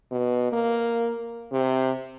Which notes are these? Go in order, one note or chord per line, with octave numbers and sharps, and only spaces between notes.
B2
A#3
C3